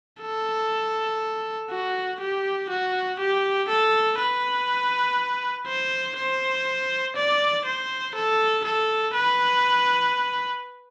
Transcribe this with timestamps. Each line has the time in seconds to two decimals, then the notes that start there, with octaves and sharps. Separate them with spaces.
0.22 A4
1.71 F#4
2.21 G4
2.70 F#4
3.19 G4
3.69 A4
4.19 B4
5.67 C5
6.17 C5
7.16 D5
7.65 C5
8.15 A4
8.65 A4
9.14 B4